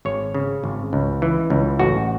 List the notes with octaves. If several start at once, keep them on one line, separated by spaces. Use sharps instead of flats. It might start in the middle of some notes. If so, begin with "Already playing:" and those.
G#1 C#5
C#3
G#1
C#2
E3
C#2
A1 F#4